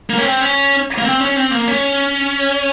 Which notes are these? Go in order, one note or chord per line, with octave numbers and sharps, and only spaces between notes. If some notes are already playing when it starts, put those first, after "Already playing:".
A#3
C#4
C4
C#4
A#3
C4
C#4
C4
A#3
C#4